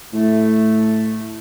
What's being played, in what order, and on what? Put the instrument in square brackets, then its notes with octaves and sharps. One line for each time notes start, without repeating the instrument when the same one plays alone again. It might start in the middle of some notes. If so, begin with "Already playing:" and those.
[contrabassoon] A2 [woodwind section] A3